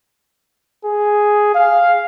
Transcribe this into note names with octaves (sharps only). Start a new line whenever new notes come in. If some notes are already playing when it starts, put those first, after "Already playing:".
G#4
F5